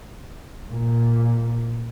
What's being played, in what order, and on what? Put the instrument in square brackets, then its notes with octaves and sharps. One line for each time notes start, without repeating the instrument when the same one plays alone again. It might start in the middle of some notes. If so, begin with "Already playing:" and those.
[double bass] A#2